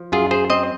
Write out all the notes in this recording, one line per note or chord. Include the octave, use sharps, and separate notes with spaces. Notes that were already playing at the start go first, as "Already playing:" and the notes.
Already playing: F3
F#2 F4 G#4
G#4 C5
C4 C5 D#5